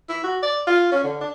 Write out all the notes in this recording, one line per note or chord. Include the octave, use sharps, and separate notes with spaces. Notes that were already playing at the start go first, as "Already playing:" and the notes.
E4
F#4
D5
F4
C#4
D3
D4